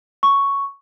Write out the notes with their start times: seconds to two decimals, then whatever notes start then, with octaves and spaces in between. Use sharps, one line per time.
0.23 C#6